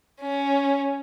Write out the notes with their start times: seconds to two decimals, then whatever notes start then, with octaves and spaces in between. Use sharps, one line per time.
0.20 C#4